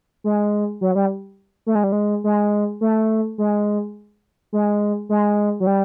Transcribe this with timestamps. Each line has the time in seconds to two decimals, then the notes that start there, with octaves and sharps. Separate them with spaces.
0.24 G#3
0.81 F#3
0.95 G3
1.67 A3
1.75 G#3
1.84 G3
1.92 G#3
2.24 G#3
2.81 A3
3.38 G#3
4.53 G#3
5.09 G#3
5.60 F#3
5.67 G3